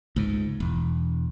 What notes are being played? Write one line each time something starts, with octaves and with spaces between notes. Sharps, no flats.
C#2 G#2
E1